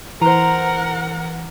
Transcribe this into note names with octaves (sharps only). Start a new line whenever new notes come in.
E3 A#4 C5 F#5 A#5